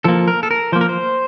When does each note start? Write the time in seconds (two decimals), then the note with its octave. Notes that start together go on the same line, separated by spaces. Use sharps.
0.04 F3 A#3 A4
0.28 A#4
0.43 A4
0.51 A#4
0.72 F3 C5
0.76 A#3
0.81 A#4
0.89 C5